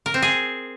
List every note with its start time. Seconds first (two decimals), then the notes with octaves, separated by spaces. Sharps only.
0.06 A#4
0.14 C4
0.22 G#4